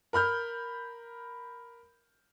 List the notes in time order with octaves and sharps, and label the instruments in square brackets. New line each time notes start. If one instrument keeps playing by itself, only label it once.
[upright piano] A#4 B5 F6 G6